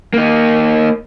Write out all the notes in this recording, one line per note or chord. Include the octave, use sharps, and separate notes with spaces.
A#3 D#4